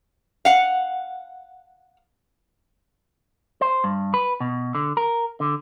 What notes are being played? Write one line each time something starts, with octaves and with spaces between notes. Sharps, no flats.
F5 F#5
C5
G2
B4
B2
D3
A#4
D3